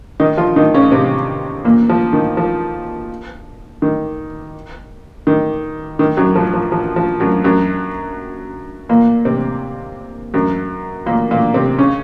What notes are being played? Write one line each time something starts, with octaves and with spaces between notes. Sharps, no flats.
D#3 D#4
F3 F4
D#3 D#4
C#3 C#4
C3 C4
A#2 A#3
F3
D#3
F3
D#3
D#3
D#3
F#2 F#3
F3
F3
F3
F3
F#2 F#3
F#2 F#3
A#2 A#3
C3 C4
F#2 F#3
A#2 A#3
A#2 A#3
C3 C4
C#3 C#4